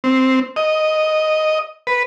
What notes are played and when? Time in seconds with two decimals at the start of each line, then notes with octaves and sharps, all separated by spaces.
0.04 C4
0.56 D#5
1.87 B4